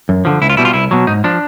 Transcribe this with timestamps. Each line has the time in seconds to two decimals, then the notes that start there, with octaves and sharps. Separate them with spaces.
0.09 F#2
0.25 D3 F3
0.42 C#2 E4
0.50 F4
0.57 B2 G3 E4
0.65 F4
0.73 C2 E4
0.91 B2 F#3
1.07 G#2 D#4
1.24 F3 D4